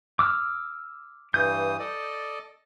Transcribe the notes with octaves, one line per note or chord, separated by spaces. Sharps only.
D6 E6 F6
G2 E3 D#6 G6
A4 D5 D#5